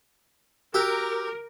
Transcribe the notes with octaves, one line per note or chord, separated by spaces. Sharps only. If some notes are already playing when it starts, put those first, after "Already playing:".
F#4 G4 A#4 E6 F#6